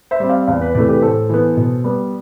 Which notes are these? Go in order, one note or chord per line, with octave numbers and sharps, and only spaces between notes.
C5 E5
G3 C4
D5 F5
E2 D5 F5
B4 D5
C3 E3 A3 B4 D5
G4 B4
A2 A4 C5
E3 B3
B2
G3 B3